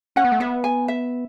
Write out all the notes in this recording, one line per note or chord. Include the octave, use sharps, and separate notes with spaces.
C#4 F#5
B3
A3
B3 E5
G#5
E5